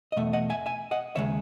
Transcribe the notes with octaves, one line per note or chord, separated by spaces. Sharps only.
D#5
E2 B2 A3 E5
D#5 F#5
E5 G#5
E5 G#5
D#5 F#5
D#2 C#3 G#3 C#5 E5